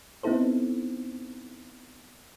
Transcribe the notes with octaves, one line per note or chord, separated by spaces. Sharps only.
B3 C4 D#4 E4 A4 C5